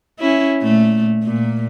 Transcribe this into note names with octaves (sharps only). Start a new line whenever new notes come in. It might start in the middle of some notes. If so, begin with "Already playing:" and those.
C#4 E4
A#2 A3
A#2